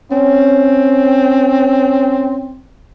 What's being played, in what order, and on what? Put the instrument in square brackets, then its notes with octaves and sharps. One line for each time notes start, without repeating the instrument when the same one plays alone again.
[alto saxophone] C4 [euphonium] C#4